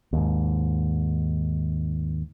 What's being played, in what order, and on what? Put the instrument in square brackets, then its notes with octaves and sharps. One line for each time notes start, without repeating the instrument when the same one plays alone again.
[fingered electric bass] D#2 G#2